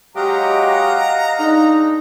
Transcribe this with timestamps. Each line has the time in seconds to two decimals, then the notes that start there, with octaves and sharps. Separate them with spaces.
0.16 F#3 G#3 G4 D#5 F5 F#5 A#5
1.39 G#3 D4 D#4